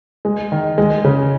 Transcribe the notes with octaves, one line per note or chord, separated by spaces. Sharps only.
G#3
D#3
G#3
C#3